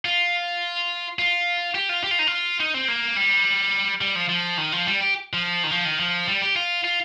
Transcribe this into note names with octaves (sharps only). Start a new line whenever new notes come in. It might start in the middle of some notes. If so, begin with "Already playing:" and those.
F4
F4
G4
F4
G4
F4
D#4
F4
D#4
C4
A#3
G3
G3
F3
F3
D#3
F3
G3
G4
F3
D#3
F3
D#3
F3
G3
G4
F4
F4